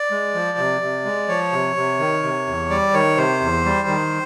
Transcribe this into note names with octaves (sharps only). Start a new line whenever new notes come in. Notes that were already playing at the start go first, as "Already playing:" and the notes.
Already playing: D5
G#3
F3
C3
C3
G#3
F3 C#5
C3
C3
D#3
C3
E2
G3 D5
D#3 C#5
C3 C5
E2
G3
D#3